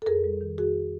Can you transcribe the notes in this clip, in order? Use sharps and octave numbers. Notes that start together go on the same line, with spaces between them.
A4
F2 G#4 A#4
G3
D#3
F2 F#4 G#4